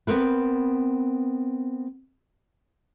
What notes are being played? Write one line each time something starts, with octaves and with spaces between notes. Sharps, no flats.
B3 C4 A#4 B4